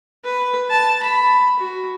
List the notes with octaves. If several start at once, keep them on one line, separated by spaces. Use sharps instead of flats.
B4
A5
B5
F#4